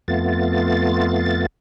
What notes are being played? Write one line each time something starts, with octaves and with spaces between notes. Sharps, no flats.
F2 A3 B3 F4 A6